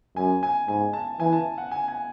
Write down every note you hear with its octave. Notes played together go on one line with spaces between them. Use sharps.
F#2 G#5
G#5
G#2 G#5
A5
E3 G#5
A5
F#5
G#5
G#5